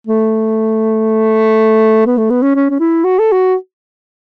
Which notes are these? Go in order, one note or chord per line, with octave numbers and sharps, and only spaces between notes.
A3
B3
A3
B3
C#4
C#4
C#4
E4
F#4
A4
F#4